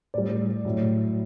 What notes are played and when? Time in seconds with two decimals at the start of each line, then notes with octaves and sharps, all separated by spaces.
0.14 A2 G3 D5
0.65 A2 F#3